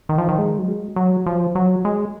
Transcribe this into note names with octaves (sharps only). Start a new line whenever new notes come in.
D#3
F3
D#3
G#3
F#3
G#3
F#3
F3
F#3
G#3